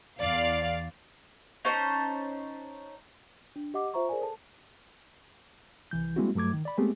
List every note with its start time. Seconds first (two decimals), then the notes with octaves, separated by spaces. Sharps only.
0.19 E2 D5 F5
1.65 C#4 D#4 C5 A5
3.56 D4
3.74 G4 D#5 F#5 D6
3.94 F4 C5 E5 A#5 C#6
4.09 G#4 A#4 C5 D5 G#5
4.22 A4 A5
5.91 C2 E3 G6
6.16 G3 G#3 A#3 C4 E4 F#4
6.35 G2 F#3 A3 D6 G#6
6.53 D#3
6.65 D5 B5
6.78 G#3 A3 B3 C4 G4 G#4